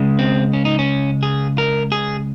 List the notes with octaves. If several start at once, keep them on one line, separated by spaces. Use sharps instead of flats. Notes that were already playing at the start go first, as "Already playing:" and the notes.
Already playing: C#2 C#3 G#3
C4
C#4
D#4
C#4
G#4
A#4
G#4